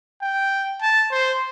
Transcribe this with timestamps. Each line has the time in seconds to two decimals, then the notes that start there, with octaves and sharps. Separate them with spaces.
0.22 G5
0.82 A5
1.11 C5